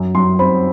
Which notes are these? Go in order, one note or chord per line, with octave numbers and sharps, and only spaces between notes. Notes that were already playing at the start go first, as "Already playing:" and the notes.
Already playing: F#2
F#2 C6
C4 B5